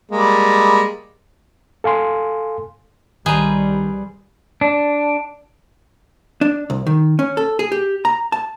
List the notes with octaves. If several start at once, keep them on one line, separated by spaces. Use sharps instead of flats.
G3 G#3 A#3
A4 F5 G#5 C6
C2 D#3 G3 G#4 B4 C5 A#5
D4
D4
C2
D#3
C#4
A4
G#4
G4
A#5
A5